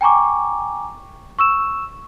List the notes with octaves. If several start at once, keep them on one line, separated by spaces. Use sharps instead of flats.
G5 G#5 A#5 C#6 D6
C#6 E6 E7